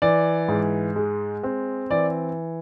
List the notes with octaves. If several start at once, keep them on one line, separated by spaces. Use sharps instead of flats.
E3 D5
G#2
G#3
C4
E3 D5